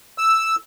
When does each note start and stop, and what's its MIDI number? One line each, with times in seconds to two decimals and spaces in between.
0.18 0.56 88